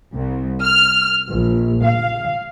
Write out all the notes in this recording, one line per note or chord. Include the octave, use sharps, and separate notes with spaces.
C2
F6
A#1
F5